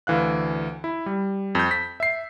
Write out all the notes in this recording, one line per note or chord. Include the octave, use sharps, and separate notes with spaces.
D2 D3 E3 F5 F#6
E4
G3
F2 G6
B6
E5 C7